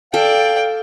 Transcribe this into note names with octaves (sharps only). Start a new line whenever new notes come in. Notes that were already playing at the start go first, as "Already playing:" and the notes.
A4 D5 F5 G5